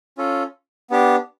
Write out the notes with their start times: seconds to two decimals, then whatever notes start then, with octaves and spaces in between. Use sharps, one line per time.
0.18 C#4 F4 A4
0.90 B3 D4 G4